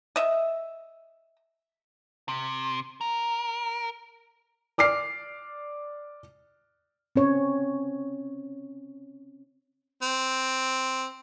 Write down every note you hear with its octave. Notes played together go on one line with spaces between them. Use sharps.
D#5 E5
C3
A#4
D5 D6 F6 C7
C4 C#4 C#5
C4